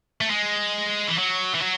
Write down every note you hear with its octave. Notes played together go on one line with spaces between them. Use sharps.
A3
G#3
E3
F#3
E3
F#3